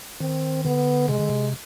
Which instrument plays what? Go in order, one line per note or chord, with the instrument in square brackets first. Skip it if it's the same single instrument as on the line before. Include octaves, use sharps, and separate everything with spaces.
[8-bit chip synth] D#3 [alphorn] C4
[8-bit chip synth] D3 [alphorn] B3
[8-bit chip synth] C3 [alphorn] G#3
[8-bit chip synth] D3
C3